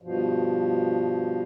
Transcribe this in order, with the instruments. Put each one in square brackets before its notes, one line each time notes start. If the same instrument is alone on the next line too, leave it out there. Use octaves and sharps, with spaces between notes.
[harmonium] G2 B2 F3